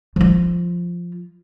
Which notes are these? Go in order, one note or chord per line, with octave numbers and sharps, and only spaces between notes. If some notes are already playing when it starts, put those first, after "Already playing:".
F3 F4